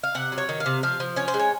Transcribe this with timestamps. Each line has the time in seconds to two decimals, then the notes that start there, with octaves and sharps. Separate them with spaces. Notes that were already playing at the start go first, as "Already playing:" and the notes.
0.03 F5
0.15 C3 F#5
0.32 F#3
0.38 C#5
0.49 D#3
0.60 F5
0.66 C3
0.83 F3 F5
1.00 F3
1.16 C#4 C#5
1.28 C5
1.34 G#3
1.39 C#5